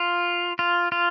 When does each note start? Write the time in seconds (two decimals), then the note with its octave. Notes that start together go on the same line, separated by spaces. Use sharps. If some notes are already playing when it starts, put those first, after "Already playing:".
Already playing: F4
0.59 F4
0.92 F4